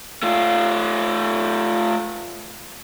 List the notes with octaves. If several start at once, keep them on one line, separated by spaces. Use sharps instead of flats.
A3 F4